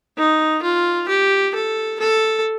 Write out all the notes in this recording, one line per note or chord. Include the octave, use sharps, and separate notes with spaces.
D#4
F4
G4
A4
A4